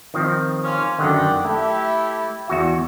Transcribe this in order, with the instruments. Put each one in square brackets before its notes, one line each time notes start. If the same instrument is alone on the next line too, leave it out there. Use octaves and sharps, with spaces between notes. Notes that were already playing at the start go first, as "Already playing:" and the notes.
[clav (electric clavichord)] D#3 F3 C4
[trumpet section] A#3 C#4 F4
[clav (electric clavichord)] F#2 D3 D#3 [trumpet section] D5 F#5 G5
[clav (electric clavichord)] A3 [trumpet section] E4 G4 A4
[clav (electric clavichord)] E2 F#4 E5